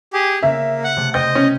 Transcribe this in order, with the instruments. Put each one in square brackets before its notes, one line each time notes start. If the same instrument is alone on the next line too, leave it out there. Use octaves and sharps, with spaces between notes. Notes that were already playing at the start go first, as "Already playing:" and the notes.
[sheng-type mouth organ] G4 G#4
[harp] C#3 [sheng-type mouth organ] A#3 [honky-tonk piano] E5
[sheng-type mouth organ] F#5 [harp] A#6
[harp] C3 A3
[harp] C5 G5 C6 [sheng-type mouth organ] D#5 [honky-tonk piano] G6
[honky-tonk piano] C#4